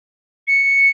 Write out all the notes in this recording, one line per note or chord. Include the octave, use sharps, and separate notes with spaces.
C#7